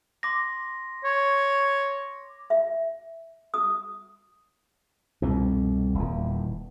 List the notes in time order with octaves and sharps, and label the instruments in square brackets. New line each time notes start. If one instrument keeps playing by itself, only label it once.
[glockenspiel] C6 D6 A#6
[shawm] C#5
[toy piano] E5
D#6
[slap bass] C2 F2 B2
D#1 E2